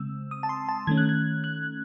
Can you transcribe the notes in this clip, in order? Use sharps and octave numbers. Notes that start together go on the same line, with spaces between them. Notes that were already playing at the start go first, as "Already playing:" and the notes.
Already playing: C#3 G#3 C4 E6
D#6
A5
C6
A5
D#3 A3 C#4 G#6
F#6
G#6
F#6